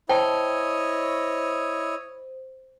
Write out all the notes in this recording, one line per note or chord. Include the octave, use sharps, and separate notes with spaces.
E4 C5 C#5 D#5 G5 A5